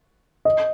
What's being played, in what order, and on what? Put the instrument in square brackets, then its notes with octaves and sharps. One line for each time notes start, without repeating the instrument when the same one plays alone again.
[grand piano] D#5